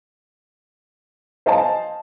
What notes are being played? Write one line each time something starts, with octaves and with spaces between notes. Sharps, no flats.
C5 D#5 F5 G#5 A5